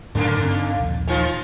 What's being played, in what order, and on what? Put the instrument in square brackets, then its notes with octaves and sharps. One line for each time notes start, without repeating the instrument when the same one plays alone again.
[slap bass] F#2 A2 C#4 [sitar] C#3 A#3
[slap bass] G2 C4
A#1 D#2
[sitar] D#3 E3 F4